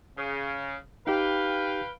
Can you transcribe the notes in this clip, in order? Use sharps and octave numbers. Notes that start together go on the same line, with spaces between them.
C#3
D#4 G4 B4 F5 G5